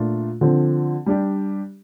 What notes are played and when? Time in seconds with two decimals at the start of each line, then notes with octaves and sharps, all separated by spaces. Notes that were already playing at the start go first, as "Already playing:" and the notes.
Already playing: A#2 A3 D4 F4
0.41 D3 F3 C4
1.06 G3 D4 G4